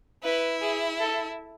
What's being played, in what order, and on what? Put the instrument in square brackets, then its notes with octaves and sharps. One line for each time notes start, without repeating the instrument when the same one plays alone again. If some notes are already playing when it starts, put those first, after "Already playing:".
[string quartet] E4 [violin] B4
[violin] G#4
A4